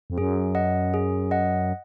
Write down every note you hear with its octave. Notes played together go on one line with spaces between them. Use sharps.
F2
F#2 G#4
D#5 F#5
G#4
D#5 F#5